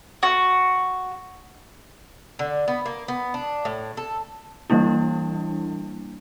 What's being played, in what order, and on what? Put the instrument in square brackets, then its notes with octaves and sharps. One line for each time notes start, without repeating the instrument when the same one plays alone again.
[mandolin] F#4
[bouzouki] D3
B3
A#3
B3
D4
A2
A4
[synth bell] E3 G3 A#3 D4 E4